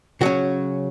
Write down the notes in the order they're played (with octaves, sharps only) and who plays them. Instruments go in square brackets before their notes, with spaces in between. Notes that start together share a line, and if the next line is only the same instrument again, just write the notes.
[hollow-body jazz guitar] C#3 F#3 C#4 F#4